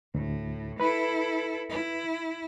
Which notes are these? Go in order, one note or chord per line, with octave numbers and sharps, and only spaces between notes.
D2 A2
E4 A4 B4 B5
E4